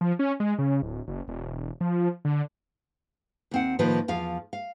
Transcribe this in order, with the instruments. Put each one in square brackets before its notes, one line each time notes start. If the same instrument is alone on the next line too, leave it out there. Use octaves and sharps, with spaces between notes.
[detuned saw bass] F3
C#4
G#3
C#3
D1
F#1
E1
F3
D3
[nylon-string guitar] D#2 C4 F#5
A2 D#3 F3 A#3 B4
E2 F3 F5
F5